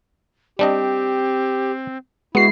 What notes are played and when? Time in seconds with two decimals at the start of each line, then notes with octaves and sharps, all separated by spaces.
0.59 G3 C4 D4 G4 D#5
2.35 G#3 B3 E4 F#4 C7